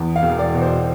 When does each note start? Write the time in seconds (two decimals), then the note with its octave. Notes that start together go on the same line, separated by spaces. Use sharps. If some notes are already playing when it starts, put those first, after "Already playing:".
Already playing: E2
0.16 F5
0.23 E1
0.39 D5
0.54 B2
0.62 C5